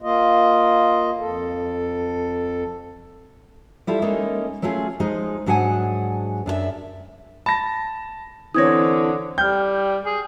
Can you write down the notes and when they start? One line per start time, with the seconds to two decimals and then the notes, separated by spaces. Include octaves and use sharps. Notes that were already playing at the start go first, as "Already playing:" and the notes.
0.02 A#3 F4 D#5
1.19 F2 A4
3.87 G3 E4 F4 A4
4.02 G#3 A#3 C#4 D#4 A4
4.62 F#3 A3 C#4 F4 G#4
5.00 F3 G#3 D#4 G#4
5.46 G#2 F#3 D4 G#4 F#5 G#5
6.46 F#2 D4 A4 E5
7.46 A5 B5 A#6
8.54 D3 E3 C4 C#5 D#6 G#6 A#6
9.38 G3 G5 F6 G6
10.05 G#4